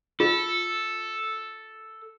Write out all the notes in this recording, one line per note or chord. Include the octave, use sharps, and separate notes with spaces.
F4 A4